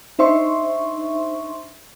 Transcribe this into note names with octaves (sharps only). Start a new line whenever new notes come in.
D4 D#4 C5 E5 C6 C#6